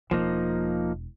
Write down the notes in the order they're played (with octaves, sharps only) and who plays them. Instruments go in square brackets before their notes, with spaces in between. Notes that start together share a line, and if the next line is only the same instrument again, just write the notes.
[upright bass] E1 [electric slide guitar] F3 A#3 D#4